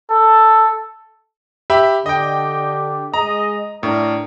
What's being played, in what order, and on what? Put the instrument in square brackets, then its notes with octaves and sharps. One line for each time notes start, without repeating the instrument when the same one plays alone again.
[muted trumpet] A4
[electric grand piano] G4 E5 B5
[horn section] D3 D4 G4 [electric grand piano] D#5 G5
[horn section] G#3 D#5 [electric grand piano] A#5
[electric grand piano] A2 [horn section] D4 A#4